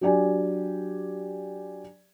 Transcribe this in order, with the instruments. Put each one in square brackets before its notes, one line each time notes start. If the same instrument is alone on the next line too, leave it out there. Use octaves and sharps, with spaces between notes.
[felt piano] F#3 D4 G4 D5 G#5